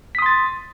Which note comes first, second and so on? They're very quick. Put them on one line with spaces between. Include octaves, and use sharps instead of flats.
B6 D#6 C6 A6